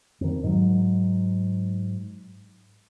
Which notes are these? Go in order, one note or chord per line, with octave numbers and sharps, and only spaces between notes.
F2 D#3
G#2 F#3